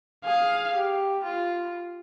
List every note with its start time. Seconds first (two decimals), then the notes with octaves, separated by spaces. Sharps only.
0.25 G#4 F5
0.74 G4
1.23 F4